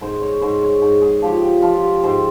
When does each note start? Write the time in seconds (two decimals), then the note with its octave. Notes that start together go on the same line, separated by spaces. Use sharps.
0.01 G#2 C5
0.21 C#5
0.41 G#2 C5
0.63 C#5
0.82 G#2
1.02 G#4
1.22 F3 G4
1.43 G4
1.62 F3 F4
1.83 G4
2.03 G#2 C5